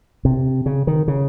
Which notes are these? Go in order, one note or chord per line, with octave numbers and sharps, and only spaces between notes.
C3
C#3
D#3
C#3